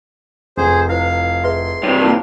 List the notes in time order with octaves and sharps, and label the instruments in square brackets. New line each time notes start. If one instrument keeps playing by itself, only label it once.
[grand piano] F1 [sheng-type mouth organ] G#4 C5
[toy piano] E4 B4 C5 [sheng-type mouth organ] F5
[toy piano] G#4 B4 E5 [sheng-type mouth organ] C6
[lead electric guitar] G2 C3 [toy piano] C5 C#5
[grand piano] A#3 A#4 [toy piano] D#4 E4